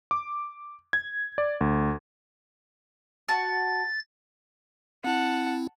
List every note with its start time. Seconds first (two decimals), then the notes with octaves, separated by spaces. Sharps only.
0.11 D6
0.93 G#6
1.38 D5
1.61 D2
3.28 F#4 A5 A6
5.04 C4 E4 F#5 A5